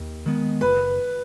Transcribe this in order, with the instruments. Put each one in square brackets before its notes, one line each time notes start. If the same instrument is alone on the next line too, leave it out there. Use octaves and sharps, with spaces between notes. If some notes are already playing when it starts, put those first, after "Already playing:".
Already playing: [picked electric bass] D#2
D#3 G#3 B3
[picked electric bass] F#1 [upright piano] B4